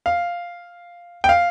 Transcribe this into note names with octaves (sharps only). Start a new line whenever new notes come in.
F5
G5
F5